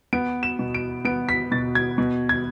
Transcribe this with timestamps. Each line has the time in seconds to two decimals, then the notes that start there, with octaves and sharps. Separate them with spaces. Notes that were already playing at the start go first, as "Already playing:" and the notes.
0.13 B3 D7
0.43 E7
0.59 B2
0.74 D7
1.05 B3 D7
1.29 B6
1.52 B2 A6
1.75 G#6
1.98 B2
2.29 G#6